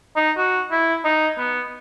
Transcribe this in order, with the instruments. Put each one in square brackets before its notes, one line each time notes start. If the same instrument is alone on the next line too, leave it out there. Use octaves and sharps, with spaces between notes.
[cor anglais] D#4
F#4
E4
D#4
B3